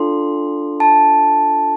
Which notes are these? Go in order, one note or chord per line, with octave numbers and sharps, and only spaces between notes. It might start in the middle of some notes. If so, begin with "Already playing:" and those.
Already playing: D4 F4 A4 C6
A5